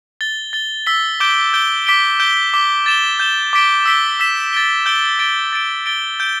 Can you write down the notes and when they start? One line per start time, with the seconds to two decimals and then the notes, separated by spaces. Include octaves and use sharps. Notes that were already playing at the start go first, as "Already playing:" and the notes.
0.21 A6 G7
0.53 A6 G7
0.86 E6 B6 G7
1.20 D6 G6 D7 G7
1.53 G6 D7 G7
1.86 D6 B6 D7 G7
2.20 G6 D7 G7
2.54 D6 B6 G7
2.86 A6 E7 G7
3.19 G6 E7 G7
3.53 D6 B6 D7 G7
3.86 E6 B6 D7 G7
4.20 E6 B6 E7
4.53 A6 D7 G7
4.86 E6 G6 D7 G7
5.19 A6 D7 G7
5.53 A6 D7 G7
5.86 A6 D7 G7
6.20 G6 D7 G7